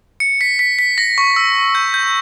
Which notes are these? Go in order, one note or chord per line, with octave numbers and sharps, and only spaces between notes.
C#7
B6
B6
B6
A#6
C#6
E6
G6
G6